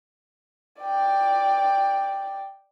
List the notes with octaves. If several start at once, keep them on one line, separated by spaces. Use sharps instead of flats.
D5 G5